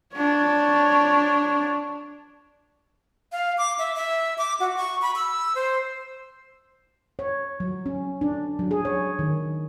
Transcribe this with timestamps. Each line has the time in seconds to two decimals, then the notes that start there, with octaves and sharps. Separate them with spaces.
0.15 D4 C#5
3.32 F5
3.58 D6
3.79 E5
3.96 E5
4.38 D6
4.60 F#4
4.77 C#6
5.02 B5
5.16 E6
5.55 C5
7.19 C#5
7.60 F#3
7.86 C#4
8.21 D4
8.59 F#3
8.71 G#4
8.85 C#5
9.19 D#3